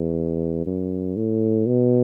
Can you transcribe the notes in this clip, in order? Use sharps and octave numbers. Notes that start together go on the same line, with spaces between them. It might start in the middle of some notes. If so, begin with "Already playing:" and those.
Already playing: E2
F#2
A2
B2